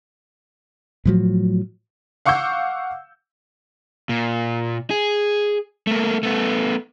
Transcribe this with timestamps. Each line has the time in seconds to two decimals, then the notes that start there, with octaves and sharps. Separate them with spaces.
1.05 A2 F3 F#3
2.26 F5 F#5 C#6 D6 E6 G6
4.09 A#2
4.90 G#4
5.87 A3 A#3
6.23 A3 B3